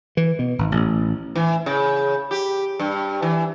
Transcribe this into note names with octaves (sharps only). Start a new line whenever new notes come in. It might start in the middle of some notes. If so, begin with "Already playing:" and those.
E3
B2
G#1
A1
E3
C#3
G4
G2
E3